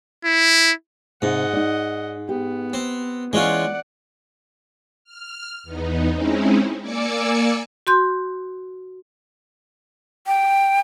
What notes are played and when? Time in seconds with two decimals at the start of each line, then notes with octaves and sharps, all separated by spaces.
0.25 E4
1.22 G#2 C3 D#5 F#5
1.53 D#4 D5
2.29 B3 G4
2.73 C4
3.33 E3 G#3 C#4 F4 D5 F#5
5.04 F6
5.63 E2 B3 D#4
6.10 G#3 C4 C#4 D#4 E4
6.82 A#3 D5 G#5 D6 E6 C#7
7.87 F#4 C6 G6
10.27 G5